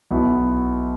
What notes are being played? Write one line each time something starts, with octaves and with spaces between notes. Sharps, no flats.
B1 B2 B3 E4